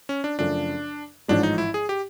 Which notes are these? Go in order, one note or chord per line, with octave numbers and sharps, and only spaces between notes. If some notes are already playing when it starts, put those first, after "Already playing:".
C#4
D4
F#2 C#3 F3 A3 C#4 D4
A1 G#2 F3 G#3 D4
D#4
E4
G#4
G4